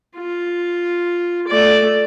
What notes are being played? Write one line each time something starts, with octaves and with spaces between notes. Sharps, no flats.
F4
A3 D5